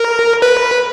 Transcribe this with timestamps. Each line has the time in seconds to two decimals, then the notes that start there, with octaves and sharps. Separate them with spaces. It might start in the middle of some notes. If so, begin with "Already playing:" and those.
Already playing: A#4
0.42 B4